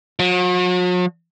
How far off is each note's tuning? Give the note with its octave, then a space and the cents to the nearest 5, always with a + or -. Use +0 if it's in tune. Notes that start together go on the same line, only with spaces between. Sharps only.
F#3 -45